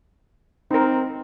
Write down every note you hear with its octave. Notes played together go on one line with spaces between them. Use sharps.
C4 D#4 A#4